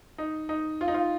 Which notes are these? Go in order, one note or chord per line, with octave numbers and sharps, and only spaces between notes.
D#4
D#4
F4
D#4
F4